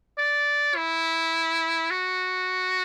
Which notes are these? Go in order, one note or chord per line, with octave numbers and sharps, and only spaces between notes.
D5
E4
F#4